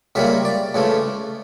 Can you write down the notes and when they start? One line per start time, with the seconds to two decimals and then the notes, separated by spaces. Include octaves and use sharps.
0.15 C#2 C#3 G3 A#3 E5
0.45 D5
0.74 C#2 C#3 E3 A3